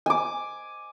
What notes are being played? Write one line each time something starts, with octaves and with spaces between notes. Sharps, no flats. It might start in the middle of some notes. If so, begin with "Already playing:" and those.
G#5 D6